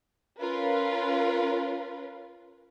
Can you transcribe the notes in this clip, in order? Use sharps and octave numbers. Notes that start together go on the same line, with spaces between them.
C#4 F4 A#4 B4